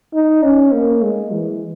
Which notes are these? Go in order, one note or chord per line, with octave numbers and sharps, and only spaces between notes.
D#4
C#4
A#3
G#3
E3